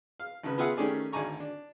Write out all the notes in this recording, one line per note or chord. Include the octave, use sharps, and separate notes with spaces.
F5
G#1 C#3 B4
B3 F4 G#4 E5 F#5
D#3 A3 C#4 G4 G#4 D5
G#1 D2 D5 G#5 A#5 C#6
D4